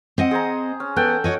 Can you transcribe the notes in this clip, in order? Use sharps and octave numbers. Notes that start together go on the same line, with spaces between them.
C4 D#5 F#5
G#4 C5 A#5
C#4
B3 A4 F#5 G5
F#4 C#5 D#5